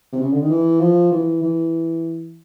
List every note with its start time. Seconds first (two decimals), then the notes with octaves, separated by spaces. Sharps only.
0.12 C3
0.22 C#3
0.32 D3
0.41 D#3
0.50 E3
0.80 F3
1.12 E3
1.42 E3